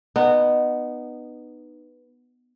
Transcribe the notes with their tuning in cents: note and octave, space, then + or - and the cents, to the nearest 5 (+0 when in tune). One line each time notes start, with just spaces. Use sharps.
B3 +0 D#4 -25